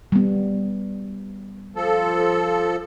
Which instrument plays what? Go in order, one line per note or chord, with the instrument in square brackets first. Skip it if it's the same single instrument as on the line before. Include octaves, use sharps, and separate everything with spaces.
[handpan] G3 B3
[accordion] F3 A4